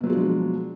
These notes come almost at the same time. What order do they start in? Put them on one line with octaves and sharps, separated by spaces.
B2 F#3 F3 G#3 D4